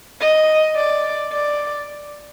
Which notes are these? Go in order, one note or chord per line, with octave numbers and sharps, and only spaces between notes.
D#5
D5
D5